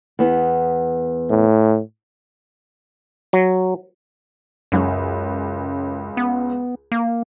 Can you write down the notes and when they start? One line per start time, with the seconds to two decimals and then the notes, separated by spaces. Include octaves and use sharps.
0.19 E2 B3
1.31 A2
3.33 F#3
4.72 C#2 F#2 C#4
6.17 B3
6.92 A#3